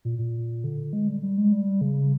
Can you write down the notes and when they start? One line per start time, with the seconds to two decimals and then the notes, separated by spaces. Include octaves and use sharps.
0.05 A#2
0.19 A#2
0.64 D3
0.93 G#3
1.08 G3
1.23 G3
1.38 G#3
1.52 G3
1.81 C#3